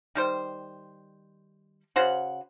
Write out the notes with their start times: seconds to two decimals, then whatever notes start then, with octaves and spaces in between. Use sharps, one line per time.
0.15 D#3 G3 C5
1.96 C#3 F#4 C5 F#5